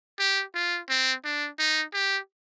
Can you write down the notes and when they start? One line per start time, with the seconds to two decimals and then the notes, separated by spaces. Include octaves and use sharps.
0.19 G4
0.55 F4
0.89 C4
1.25 D4
1.59 D#4
1.94 G4